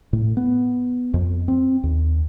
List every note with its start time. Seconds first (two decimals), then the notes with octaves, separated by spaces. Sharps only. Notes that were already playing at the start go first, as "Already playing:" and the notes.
0.13 A2
0.37 B3
1.14 F2
1.48 C4
1.83 D#2